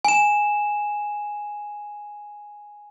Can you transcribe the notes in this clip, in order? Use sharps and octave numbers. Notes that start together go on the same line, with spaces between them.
G#5 E7